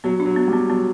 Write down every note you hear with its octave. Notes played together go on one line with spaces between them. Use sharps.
F#3 B3
D4
F#3
B3
G3
B3
F#3 B3